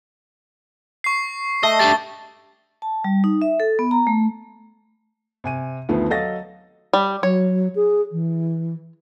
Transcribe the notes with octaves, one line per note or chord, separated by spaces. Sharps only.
C#6 C7
A3 D#5 G7
G3 D4 A6
A5
G3
D#4
E5
A4
B3
A#5
A3
C3 G#5 D#7
D2 D#3 F3 A3 B3
F#3 A4 D#5 F5 A6 A#6
G3
F#3 C#5
G#4
E3